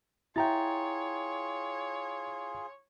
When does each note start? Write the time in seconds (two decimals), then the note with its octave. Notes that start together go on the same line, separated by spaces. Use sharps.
0.36 E4 F4 G#4 C#5 G5 A#5 A6